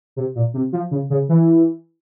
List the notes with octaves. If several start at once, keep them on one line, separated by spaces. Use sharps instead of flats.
C3
A#2
C3
F3
C#3
C#3
E3